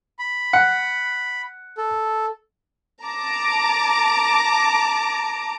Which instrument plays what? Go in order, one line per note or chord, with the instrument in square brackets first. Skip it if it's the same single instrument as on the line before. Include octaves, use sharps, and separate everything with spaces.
[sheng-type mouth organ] B5
[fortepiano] F#5
[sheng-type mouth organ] A4
[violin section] A5 A#5 D6